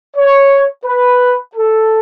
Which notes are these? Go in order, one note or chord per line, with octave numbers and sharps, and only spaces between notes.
C#5
B4
A4